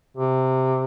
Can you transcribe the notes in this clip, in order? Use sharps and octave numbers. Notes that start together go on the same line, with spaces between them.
C3